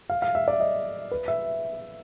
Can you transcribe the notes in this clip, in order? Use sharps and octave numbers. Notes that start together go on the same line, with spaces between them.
F5
F5
E5
D5
D#5
B4
E5